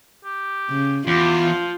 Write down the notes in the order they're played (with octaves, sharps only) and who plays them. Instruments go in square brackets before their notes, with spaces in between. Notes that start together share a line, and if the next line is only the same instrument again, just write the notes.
[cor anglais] G4
[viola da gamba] C#3
[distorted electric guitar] E2 [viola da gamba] F4 [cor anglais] G4
[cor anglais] F3